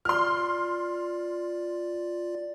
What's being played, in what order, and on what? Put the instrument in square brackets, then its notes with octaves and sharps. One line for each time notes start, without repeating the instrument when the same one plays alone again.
[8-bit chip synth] F4 D5 [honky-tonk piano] C6 F6